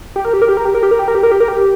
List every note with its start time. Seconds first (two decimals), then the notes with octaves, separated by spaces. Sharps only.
0.16 G4
0.25 A#4
0.33 G4
0.42 A#4
0.49 G4
0.57 A#4
0.65 G4
0.75 A#4
0.83 G4
0.91 A#4
0.99 G4
1.08 A#4
1.15 G4
1.23 A#4
1.31 G4
1.40 A#4
1.48 G4